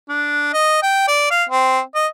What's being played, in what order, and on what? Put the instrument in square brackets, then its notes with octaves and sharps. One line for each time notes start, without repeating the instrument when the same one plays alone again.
[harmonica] D4
D#5
G5
D5
F5
C4
D#5